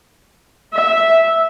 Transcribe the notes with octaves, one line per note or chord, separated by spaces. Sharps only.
E5